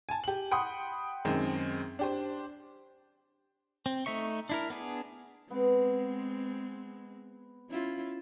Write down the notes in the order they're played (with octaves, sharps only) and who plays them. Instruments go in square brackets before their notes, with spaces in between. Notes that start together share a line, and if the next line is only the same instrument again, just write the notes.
[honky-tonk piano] G#5 A5
G4 F#7
F#5 G5 B5 C6 D#6
F#2 D#3 G#3 C4
D4 G4 C5
[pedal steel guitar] C4
A3 D#4 E5 C#6
D4 E4 A#4
B3 D4 G#4
[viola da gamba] G#3 C4 [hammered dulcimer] B3
[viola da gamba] C#4 E4 F4